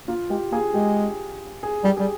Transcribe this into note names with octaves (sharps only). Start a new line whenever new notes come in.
A#3 F4
G#3 G4
A#3 G#4
G#3 G4
G#4
G3 G4
G3 G#4